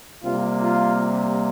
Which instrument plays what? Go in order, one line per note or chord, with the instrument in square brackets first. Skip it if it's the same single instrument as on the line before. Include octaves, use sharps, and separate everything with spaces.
[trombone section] C3 G3 A#3 F4
F4